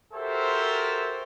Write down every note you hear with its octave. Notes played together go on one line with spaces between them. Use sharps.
F#4 G4 A4 A#4 C5 E5